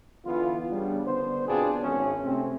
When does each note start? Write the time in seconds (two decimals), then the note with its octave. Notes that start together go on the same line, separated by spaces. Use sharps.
0.25 D3 E3 B3 F4
0.70 C#3 G3 B3 D4
1.04 D3 B3 C5
1.46 B2 B3 C4 D4 F4 G#4
1.81 G#1 C#4
2.22 C3 A3 C4